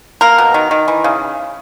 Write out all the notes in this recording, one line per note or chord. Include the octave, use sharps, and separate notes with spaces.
A#3 A#4
B2
D#3
D#3
E3
C#3